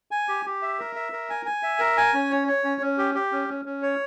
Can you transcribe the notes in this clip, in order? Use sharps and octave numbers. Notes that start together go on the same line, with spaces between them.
G#5
G4
G4
E5
A#4
E5
A#4
G#5
G#5
E5
A#4
G#5
C#4
C#5
C#5
C#4
C#4
G4
G4
C#4
C#4
C#4
C#5